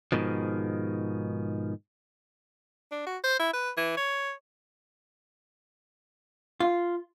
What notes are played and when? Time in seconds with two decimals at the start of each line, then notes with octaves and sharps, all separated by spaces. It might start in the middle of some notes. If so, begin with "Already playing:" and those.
0.12 G#2 B2 D#3 F3
2.91 D4
3.06 F#4
3.24 C5
3.40 E4
3.53 B4
3.77 E3
3.97 C#5
6.60 F4